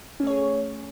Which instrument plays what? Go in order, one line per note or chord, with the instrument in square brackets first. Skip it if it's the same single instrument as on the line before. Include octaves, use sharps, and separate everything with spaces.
[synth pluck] C#4
A3
C#5
G#4